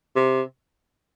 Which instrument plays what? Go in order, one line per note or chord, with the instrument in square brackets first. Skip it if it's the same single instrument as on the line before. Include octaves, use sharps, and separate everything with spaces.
[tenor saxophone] C3